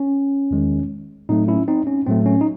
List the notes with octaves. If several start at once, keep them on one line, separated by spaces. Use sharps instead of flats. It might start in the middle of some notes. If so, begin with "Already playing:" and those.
Already playing: C#4
E2 D#3 G#3
A2 F#3 A3 C4 D#4
C#4 E4
C4 D#4
C#4
A2 F#3 A3 C4
C#4
D#4